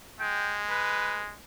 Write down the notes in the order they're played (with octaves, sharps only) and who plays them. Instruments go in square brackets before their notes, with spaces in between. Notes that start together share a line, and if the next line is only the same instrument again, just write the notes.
[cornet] G#3 [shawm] G5
[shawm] B4